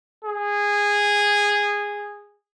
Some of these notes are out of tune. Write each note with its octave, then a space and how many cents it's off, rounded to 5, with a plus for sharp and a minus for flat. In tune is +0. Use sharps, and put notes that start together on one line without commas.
G#4 -15